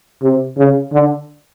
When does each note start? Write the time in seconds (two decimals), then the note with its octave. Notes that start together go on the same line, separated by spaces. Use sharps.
0.23 C3
0.58 C#3
0.93 D3